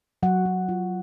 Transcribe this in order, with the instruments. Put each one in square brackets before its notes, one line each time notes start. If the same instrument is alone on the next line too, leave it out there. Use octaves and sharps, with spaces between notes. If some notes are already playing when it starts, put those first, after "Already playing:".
[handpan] F#3 F#5
F#3
F4